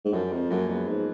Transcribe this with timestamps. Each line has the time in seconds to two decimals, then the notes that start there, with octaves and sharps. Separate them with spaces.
0.05 G#2
0.13 F#2 F3
0.31 F2 F3 G#3
0.50 F#2 F#3 A#3
0.69 F#2 G#3 B3
0.88 G#2